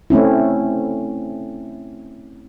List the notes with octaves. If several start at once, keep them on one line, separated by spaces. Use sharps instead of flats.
A3 C4 C#4 E4